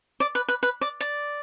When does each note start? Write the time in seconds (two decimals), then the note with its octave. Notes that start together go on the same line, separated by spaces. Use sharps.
0.20 D5
0.35 B4
0.48 B4
0.63 B4
0.81 D5
1.01 D5